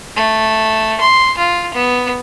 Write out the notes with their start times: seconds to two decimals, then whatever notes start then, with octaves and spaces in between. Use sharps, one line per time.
0.16 A3
1.00 C6
1.38 F4
1.74 B3